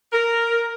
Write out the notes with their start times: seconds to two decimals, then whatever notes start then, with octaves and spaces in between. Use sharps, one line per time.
0.13 A#4